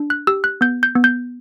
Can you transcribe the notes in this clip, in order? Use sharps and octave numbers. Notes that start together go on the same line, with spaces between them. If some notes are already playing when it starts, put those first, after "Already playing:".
Already playing: D4
F#6
G4 E6
F#6
B3 G6
G6
B3
G6